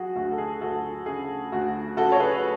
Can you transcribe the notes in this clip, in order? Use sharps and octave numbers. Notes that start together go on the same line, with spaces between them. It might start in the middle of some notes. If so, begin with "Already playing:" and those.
Already playing: F#3 F#4 G#4
D2 F#4
A4
G#4
D2 F#4 A4
C#3 G#4
D2 F#4
C#3 F#4 A4
C#5
G#4 B4